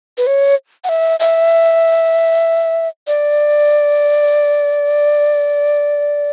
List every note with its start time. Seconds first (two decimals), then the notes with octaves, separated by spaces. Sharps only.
0.18 B4
0.27 C#5
0.84 F#5
0.89 E5
1.20 E5
3.07 D5